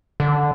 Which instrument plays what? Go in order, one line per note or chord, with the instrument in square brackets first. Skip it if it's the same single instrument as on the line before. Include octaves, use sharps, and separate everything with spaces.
[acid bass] D3